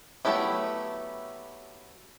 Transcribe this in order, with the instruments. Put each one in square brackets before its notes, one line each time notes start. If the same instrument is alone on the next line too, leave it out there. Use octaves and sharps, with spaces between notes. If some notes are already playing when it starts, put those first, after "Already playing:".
[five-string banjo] F#3 A3 B3 E4 G4